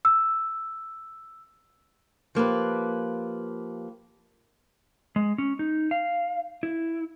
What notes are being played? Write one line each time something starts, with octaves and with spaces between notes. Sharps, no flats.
E6
F3 A#3 G4 B4
G#3
C#4
D#4
F5
E4